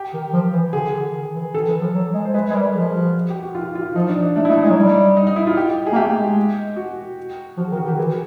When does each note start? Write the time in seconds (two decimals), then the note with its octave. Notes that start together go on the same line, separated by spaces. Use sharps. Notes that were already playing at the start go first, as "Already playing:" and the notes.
Already playing: G4
0.13 D#3
0.33 F3
0.53 E3
0.73 D3 G#4
0.90 D#3
0.93 D3
1.14 D#3
1.34 E3
1.54 D#3 A4
1.68 E3
1.81 F3
1.94 F#3
2.14 G#3
2.25 C5
2.34 G#3 B4
2.50 G#3
2.54 G3 A#4
2.74 F3 G#4
2.95 F#4
3.30 G4
3.43 F#4
3.55 F4
3.75 F4
3.95 F3 D#4
4.08 D4
4.22 D#4
4.36 A3 D4
4.45 E4
4.49 A3 D#4
4.63 G#3 D#4
4.70 F#3
4.75 G3
5.17 D#4
5.27 D#4
5.36 E4
5.47 F4
5.57 G4
5.87 G#4
5.92 A#3
5.96 A3 G4
6.17 G#3
6.77 F#4
7.57 F3 F#4
7.67 G#4
7.71 D#3
7.77 F#4
7.85 D#3
7.88 G4
7.98 E3 G#4